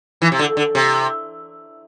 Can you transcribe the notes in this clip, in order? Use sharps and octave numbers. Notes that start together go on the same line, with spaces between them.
E3
C3
D3
D3
C3